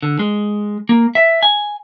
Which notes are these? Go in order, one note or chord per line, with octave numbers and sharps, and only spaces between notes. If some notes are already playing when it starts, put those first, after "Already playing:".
D3
G#3
A#3
E5
G#5